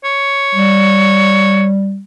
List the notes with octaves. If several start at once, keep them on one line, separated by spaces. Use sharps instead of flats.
C#5
G3